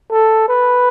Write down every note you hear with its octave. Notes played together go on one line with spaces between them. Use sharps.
A4
B4